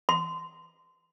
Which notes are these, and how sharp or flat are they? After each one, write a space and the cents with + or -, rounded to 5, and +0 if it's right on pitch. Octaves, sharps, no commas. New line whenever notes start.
C6 -25